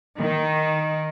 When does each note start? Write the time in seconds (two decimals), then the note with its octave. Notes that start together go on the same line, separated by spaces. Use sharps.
0.17 D#3